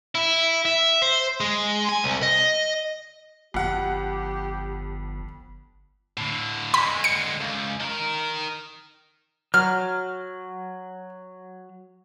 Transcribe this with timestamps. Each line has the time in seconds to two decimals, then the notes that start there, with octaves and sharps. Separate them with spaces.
0.15 E4
0.65 E5
1.02 C5
1.40 G#3
1.89 G#5
2.04 C2
2.22 D#5
3.54 G1 F2 G4 F#5
6.17 A2 D3
6.74 D3 G#3 B5
7.04 C#7
7.41 C#2
7.81 D#3 A#4
9.54 F#3 F6